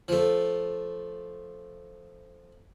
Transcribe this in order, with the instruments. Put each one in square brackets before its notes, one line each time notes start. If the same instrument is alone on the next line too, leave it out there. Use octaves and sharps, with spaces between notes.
[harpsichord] F3 A3